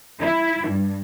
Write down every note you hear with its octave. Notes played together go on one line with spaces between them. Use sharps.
E4
G2